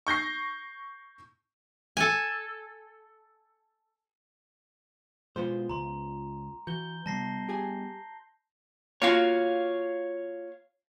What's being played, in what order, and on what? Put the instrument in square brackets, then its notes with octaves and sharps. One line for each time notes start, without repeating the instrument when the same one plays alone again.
[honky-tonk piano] C#6 G6 A#6 C7
[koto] A4 G#5
[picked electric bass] B2 G#3 [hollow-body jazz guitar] B3 F4 C5
[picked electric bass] C#2 [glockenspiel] A#5 C6
[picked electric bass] E3 [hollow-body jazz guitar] F#4 [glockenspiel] G6 G7
[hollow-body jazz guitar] C3 [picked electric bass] G3 B3 [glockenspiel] A5 A#6 C7
[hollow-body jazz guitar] G4 G#4 G#5
[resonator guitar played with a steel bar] A#3 F4 F#4 [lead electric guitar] C#5 F5